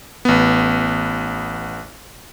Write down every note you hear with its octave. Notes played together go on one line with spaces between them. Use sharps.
A1 B3